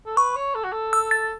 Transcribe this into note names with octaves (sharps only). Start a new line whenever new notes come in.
A4
B4 C#6
C#5
A4
F#4
A4
E6
A6